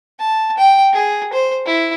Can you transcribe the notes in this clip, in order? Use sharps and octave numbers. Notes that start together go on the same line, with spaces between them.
A5
G5
G#4
C5
E4